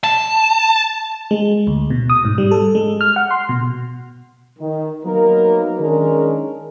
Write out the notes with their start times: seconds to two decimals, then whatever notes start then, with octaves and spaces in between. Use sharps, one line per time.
0.04 A5
1.31 G#3
1.67 D2
1.90 B2
2.10 D#6
2.25 G#2
2.38 G3
2.51 A4
2.75 G#3
3.01 F6
3.16 F#5
3.31 C6
3.49 B2
4.59 D#3
5.04 F#3 A#3 B3 D#4 A#4
5.79 D#3 G#3 C#4 D4 G#4 A#4